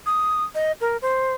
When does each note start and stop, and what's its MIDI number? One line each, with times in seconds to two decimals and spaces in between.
0.06 0.44 87
0.55 0.72 75
0.81 0.97 70
1.02 1.34 72